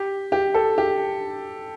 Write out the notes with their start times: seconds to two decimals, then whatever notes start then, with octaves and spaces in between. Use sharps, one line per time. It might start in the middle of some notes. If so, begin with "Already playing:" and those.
Already playing: G4
0.32 G4
0.54 A4
0.78 G4